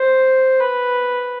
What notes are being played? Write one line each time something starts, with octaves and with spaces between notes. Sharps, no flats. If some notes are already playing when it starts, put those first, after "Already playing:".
Already playing: C5
B4